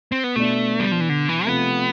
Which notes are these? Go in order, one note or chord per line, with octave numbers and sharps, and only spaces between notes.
C4
B3
B2 A3 B3 D4
G3
F3
E3
D3
E3
C3 F3 A3 B3